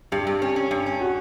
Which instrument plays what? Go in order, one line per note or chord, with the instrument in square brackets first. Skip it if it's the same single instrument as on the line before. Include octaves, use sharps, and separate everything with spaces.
[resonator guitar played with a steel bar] G2 [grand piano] G4
[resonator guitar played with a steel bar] G2
C#4
C#4
G2
C#4
[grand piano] F#4